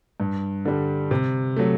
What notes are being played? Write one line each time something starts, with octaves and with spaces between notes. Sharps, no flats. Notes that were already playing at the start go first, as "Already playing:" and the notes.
G2
D3 G3
C3
F#3 A3